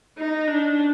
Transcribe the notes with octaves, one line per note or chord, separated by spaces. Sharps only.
D#4
D4